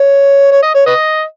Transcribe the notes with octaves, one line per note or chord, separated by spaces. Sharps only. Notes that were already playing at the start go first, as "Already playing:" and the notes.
Already playing: C#5
C#5
D#5
C#5
B4 D#5